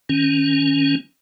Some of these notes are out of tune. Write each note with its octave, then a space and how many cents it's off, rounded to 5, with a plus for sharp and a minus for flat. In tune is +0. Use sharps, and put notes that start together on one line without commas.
D#3 +0 C#4 +0